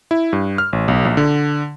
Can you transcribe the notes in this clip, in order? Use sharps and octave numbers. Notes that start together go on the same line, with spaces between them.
E4
G2
F6
A1
B1
A#1
D3